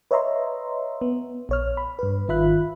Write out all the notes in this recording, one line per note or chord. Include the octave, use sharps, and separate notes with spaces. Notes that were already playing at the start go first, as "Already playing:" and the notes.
B4 C#5 D#5 E5 A#5 C6
B3
A#1 C#5 F6
B5
G2 B4
G#1 D#3 F4 E5 B5 F#6